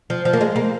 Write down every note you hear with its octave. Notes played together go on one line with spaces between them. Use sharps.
F3
F3
A#3
G#3
A#3